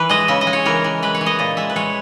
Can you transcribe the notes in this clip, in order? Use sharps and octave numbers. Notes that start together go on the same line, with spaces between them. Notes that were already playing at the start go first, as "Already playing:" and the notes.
Already playing: E3 B4
G#3 D#5
C#3 E5
D#5
G#3
C#5
E3 A#4
E3
G#3 B4
C#5
E3
D#5
A#2 D#5
G#3 E5
B4
G#3 C#5